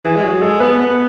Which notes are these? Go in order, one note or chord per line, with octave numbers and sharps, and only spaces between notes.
E3 G#4
G#3
F#3 G#4
G#4
G#3 A4
B3 B4
B3